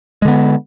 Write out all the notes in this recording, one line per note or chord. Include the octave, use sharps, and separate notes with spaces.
D3 G#3 B3